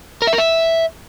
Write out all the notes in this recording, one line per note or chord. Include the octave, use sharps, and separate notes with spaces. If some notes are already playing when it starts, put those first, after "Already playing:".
A#4
E5
A#4
E5